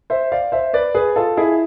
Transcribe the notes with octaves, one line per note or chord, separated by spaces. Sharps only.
C5 E5
D5 F5
C5 E5
B4 D5
G#4 B4
F4 A4
E4 G#4